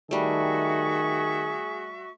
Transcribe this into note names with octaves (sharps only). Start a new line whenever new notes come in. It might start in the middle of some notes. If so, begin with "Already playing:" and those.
D#3 G3 A3 F#4 G#4 E5 C#6